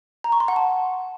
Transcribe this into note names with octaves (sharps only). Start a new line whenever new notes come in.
A#5
C#6
C6
F#5
A5